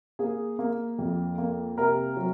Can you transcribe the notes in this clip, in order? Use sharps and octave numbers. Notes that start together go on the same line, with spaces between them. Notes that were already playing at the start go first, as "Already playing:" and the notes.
A#3 G#4
A#3
F2
A#3
C3 A#4
F#3